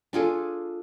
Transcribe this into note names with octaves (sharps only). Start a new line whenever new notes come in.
D4 F4 G#4 A4